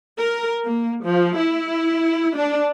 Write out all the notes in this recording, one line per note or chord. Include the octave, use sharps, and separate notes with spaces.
A#4
A#3
F3
E4
D4